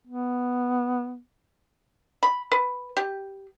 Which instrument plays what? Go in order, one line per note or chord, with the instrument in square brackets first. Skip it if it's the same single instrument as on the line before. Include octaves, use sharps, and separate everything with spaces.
[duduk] B3
[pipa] B5
B4
G4